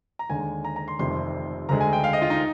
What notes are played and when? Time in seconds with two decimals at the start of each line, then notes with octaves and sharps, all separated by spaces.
0.19 A#5
0.29 D#2 D3 G#3 G#5
0.65 A#5
0.76 A#5
0.88 C6
0.99 F1 F2 C3 D#3 G3 C6
1.69 D2 D3 G#3 A#5
1.81 G#5
1.93 G5
2.04 F5
2.13 D#5
2.22 F4
2.30 D#4